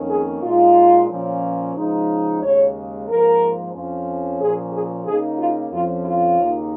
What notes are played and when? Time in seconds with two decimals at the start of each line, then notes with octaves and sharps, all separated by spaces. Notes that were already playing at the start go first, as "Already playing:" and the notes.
Already playing: F2 D#3 A#3 C#4
0.09 G#4
0.42 A#2 G#3 D#4 F4
1.09 A#2 F3 C#4
1.75 C#3 F3 G#3 D#4
2.41 D#2 C#3 G#3 C#5
3.08 G#2 F3 A#3 A#4
3.73 F2 F3 C#4
4.39 A#2 F3 C#4 G#4
4.72 G#4
5.06 C#3 A#3 D#4 G#4
5.39 F4
5.72 F2 F3 C#4 F4
6.05 F4
6.39 D#2 C#3 A#3 D#4